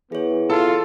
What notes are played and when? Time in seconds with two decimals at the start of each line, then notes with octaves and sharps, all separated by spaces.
0.12 E3 B3 G#4 C#5
0.50 F4 A4 A5